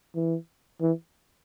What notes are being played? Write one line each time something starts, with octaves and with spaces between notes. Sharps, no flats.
E3
E3